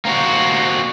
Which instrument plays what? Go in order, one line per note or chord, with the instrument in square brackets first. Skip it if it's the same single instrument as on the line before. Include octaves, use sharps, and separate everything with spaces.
[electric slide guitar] A#3 C4 F#4